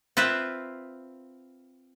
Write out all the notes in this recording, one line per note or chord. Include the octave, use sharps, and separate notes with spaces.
C4 F4 B4 E5